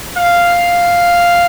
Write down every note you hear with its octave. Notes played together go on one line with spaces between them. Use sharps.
F5